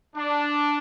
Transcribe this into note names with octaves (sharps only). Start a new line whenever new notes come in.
D4